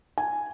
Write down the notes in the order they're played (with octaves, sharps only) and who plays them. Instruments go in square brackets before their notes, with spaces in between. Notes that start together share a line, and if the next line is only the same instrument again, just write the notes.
[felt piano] G#5